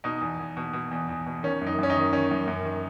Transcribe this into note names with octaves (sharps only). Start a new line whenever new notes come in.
B2 D#4
E2
E2
B2
B2
E2
E2
B2
D#3 C#4
F#2 D#4
F#2 C#4
D#4
D#3
D#3 C#4
F#2
F#2
D#3